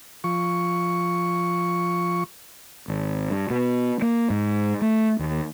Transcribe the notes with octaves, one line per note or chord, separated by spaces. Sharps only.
F3 C#6
G#1
G2
B2
A#3
G#2
A3
D#2